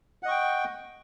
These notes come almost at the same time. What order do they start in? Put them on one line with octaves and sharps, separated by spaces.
F#5 D#5 C#6 G5